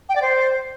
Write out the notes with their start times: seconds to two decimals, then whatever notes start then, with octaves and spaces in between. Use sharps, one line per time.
0.09 G5
0.16 D5
0.22 C5